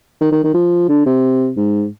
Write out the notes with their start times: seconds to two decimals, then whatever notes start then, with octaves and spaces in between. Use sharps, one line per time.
0.21 D#3
0.32 D#3
0.44 D#3
0.54 F3
0.89 D3
1.06 C3
1.57 G#2